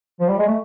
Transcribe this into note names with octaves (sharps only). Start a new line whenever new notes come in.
F3
G3
G#3
A3